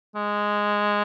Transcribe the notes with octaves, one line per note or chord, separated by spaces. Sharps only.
G#3